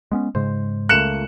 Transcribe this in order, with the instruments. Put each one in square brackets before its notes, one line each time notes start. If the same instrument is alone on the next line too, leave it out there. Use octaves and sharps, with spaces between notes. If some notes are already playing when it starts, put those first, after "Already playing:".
[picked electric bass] G#3 B3 C#4
[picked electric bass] G#2 C#3 G#3 [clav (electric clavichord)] C5
[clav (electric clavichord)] C#2 A3 A#3 [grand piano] F#6 C#7 E7